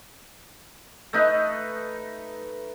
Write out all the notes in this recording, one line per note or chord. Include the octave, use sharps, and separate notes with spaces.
A3 D#4 B4